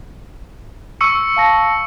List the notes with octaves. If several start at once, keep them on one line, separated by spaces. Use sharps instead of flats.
C#6 E6 C#7
F5 A5 A#6